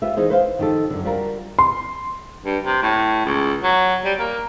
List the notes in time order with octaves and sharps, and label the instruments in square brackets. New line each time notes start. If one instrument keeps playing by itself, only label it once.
[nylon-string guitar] F4 G4 B4 E5
E3 D#4 G#4 C5
B4 C5 F5
D#3 F3 G4 A4
F#2 D3
G3 D4 F4 F#4 A#4
[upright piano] C6
[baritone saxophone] G2
C3
A2
C#2
F#3
G3
A#3